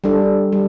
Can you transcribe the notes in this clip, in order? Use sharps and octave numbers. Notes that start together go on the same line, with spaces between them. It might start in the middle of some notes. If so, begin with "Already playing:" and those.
G3 D4 A4
G3